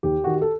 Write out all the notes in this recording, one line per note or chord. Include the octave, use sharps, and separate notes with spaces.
D#2 G4
D#3 F#4
G4
A4